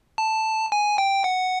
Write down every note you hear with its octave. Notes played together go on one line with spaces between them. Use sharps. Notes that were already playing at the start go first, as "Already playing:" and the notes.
A5
G#5
G5
F#5